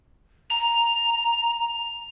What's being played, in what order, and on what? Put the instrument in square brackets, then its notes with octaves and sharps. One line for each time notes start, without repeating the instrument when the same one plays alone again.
[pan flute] A#5 [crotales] F7